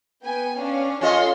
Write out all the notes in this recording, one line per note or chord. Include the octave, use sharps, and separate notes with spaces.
B3 G5 G#5
C#4 D4 F5
C#4 F4 G#4 A4 D#5 C6